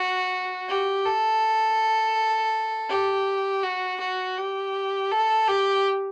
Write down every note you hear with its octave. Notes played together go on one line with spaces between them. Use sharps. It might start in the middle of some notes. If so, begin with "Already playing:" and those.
Already playing: F#4
G4
A4
G4
F#4
F#4
G4
A4
G4